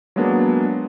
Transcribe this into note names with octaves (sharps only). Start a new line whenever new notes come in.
F#3 G#3 A#3 B3 D4